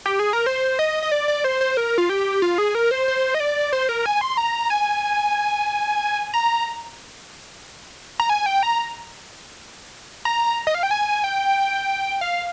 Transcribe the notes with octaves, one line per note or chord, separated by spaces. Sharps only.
G4
G#4
A#4
C5
D#5
D#5
D5
D5
C5
C5
A#4
F4
G4
F4
G#4
A#4
C5
C5
D#5
D5
C5
A#4
G#5
C6
A#5
G#5
A#5
A#5
G#5
G5
A#5
A#5
D#5
F5
G5
G#5
G5
F5